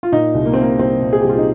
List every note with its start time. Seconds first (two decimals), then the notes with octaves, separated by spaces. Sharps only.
0.03 F4
0.12 A#2 D#4
0.34 C2
0.46 A#3
0.53 C4
0.57 A#2 A#3
0.79 C2 C4
1.01 A#2
1.13 G#4
1.21 C2 G4
1.29 F4
1.38 D#4